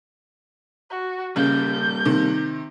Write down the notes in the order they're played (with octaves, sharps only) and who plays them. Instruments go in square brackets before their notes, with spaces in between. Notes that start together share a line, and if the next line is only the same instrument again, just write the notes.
[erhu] F#4
[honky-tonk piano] C#3 [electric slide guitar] G3 A#3 [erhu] G6
[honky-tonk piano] C3 D#3